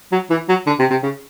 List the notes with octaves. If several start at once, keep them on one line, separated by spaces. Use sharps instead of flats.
F#3
E3
F#3
D3
C3
C3
C#3